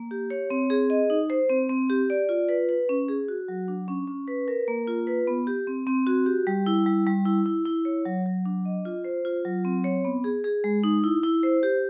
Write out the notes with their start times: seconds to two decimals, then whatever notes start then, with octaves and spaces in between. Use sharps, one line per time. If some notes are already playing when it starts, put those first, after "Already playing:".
Already playing: A#3
0.11 G4
0.30 C#5
0.50 C4
0.70 G#4
0.90 D#5
1.10 D#4
1.30 C5
1.49 C4
1.69 C4
1.90 G4
2.10 D5
2.29 F4
2.49 B4
2.69 B4
2.89 C#4
3.08 G#4
3.28 F#4
3.48 F#3
3.68 D4
3.88 C#4
4.08 C#4
4.28 B4
4.48 A#4
4.68 A#3
4.87 F4
5.07 B4
5.27 B3
5.47 G4
5.67 C4
5.87 C4
6.06 F#4
6.26 G4
6.47 G3
6.66 E4
6.86 G3
7.06 G3
7.25 E4
7.46 E4
7.66 E4
7.85 C#5
8.06 F#3
8.26 F#3
8.45 D4
8.65 D#5
8.85 F4
9.04 C5
9.25 F4
9.45 F#3
9.65 C4
9.84 C#5
10.05 B3
10.24 G#4
10.44 G#4
10.64 G#3
10.84 D#4
11.04 E4
11.23 E4
11.43 C5
11.63 G4